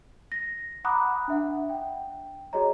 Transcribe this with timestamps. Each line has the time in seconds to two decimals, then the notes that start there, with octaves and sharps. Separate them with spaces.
0.32 A#6
0.84 F#5 A#5 B5 D6 D#6 F#6
1.28 D4 E5 F#5
1.70 G5
2.53 F#4 G#4 C#5 D#5 A#5